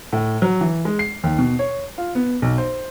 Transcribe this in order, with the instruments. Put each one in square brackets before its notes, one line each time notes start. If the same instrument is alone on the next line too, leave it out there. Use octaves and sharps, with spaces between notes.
[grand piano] A2
F#3
E3
G#3
C7
D#2
B2
C#5
F4
B3
B1
C5